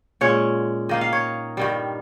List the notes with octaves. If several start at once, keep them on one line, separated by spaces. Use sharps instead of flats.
A#2 G#3 C#4 C#5
D#3 A#3 D#4 D#5
F5
C#5
G2 D#3 G3